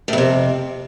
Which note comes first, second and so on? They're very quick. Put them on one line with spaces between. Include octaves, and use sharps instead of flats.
A2 F2 C3